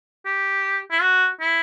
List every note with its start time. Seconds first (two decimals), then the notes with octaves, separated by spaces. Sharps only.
0.26 G4
0.91 E4
1.02 F#4
1.40 E4